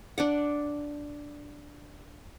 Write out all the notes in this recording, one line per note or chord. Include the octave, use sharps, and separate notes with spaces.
D4 D5 F#5